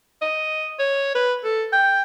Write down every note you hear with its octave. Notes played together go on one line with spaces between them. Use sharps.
D#5
C#5
B4
A4
G5